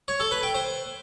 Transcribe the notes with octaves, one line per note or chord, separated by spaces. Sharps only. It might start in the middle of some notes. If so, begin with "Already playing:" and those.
C#5
A4
B4
G5
C5